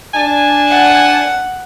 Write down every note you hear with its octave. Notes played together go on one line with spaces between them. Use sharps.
D4 G#5 A5
F#5